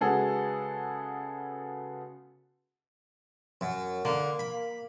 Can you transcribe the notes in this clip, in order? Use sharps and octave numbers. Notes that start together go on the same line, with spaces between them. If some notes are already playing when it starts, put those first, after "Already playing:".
C#3 G#3 B3 F#4 G#4 A4
F#2
D3 A#3
B5